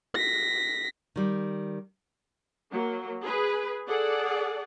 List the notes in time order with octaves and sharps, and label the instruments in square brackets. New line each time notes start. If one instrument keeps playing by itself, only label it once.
[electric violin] A#6 B6
[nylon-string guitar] D#3 G3
[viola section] F#3 A#3
G#4 B4
G#4 A4 D5 F#5